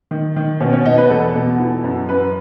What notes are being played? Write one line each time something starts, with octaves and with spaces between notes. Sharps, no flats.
D#3
D#3
B2 C#4
C#4
B2 D#4
B4
E2 A4
B2
E3
F#2
F#2 B4